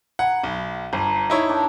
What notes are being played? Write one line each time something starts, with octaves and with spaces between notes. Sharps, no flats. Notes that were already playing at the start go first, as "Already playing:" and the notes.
F#5 G#5 A#5 B5
B1
G1 A4 A#5 B5
D#4 E4 C#5
D4 A#4 G5